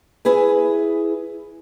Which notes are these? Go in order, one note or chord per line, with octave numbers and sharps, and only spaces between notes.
E4 G#4 B4 G#5